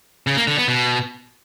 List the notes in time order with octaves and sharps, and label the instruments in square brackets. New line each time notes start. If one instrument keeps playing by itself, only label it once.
[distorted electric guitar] C#3
A#3
D3
B3
B2